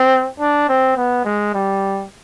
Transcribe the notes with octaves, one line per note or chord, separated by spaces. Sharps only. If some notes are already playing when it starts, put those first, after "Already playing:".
Already playing: C4
D4
C4
B3
G#3
G3